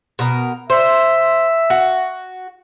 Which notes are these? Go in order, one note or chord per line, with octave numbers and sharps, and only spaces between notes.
B2 A#4
C5 E5
F#4